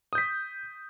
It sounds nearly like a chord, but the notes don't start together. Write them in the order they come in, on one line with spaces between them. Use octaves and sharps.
D#6 G6 B6